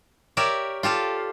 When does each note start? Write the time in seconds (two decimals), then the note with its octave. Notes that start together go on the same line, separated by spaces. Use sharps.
0.37 G4 A#4 C#5 D5 E5
0.83 F4 G4 A4 F5